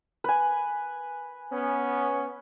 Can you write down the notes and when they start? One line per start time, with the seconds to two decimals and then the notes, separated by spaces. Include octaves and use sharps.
0.24 B4 G#5
1.53 B3 C#4